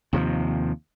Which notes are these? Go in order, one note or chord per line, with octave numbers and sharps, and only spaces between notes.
D#2 C3 F3